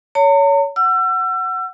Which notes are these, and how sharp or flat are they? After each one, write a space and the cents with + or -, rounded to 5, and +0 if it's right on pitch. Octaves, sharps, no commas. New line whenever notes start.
C#5 +25 A#5 -45
F#5 +0 E6 +35